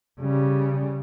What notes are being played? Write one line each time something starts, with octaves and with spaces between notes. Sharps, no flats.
C#3 G3